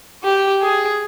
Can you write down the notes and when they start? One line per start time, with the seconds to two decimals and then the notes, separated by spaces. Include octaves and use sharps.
0.23 G4
0.61 G#4